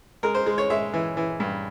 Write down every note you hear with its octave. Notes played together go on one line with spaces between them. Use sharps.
G#3 A#4
C5
G#3
C#5
G#3 E5
E3
E3
G2